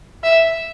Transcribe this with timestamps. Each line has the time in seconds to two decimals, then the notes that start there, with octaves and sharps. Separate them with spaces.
0.24 E5